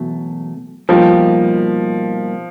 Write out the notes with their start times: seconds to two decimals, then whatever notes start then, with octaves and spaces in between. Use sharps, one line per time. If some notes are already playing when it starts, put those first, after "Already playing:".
Already playing: E2 B2 F#3 A3
0.89 B2 F3 G3 A#3 D#4 G4